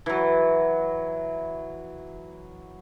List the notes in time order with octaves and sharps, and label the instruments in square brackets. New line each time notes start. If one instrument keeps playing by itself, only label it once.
[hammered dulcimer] E3 F#3